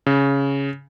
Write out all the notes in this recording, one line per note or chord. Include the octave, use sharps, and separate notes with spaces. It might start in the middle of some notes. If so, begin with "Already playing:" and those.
C#3